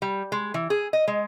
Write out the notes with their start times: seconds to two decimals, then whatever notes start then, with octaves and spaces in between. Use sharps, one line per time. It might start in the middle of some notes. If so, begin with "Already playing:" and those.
0.02 G3
0.32 G#3
0.54 E3
0.70 G#4
0.93 D#5
1.08 G#3